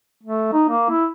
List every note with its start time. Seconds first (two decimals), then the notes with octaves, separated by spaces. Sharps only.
0.23 A3
0.52 D#4
0.69 A#3
0.90 E4